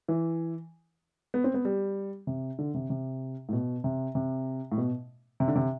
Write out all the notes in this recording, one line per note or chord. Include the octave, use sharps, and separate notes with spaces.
E3
B3
C4
B3
G3
C3
D3
C3
C3
A2
B2
C3
C3
A2
B2
C3
D3
C3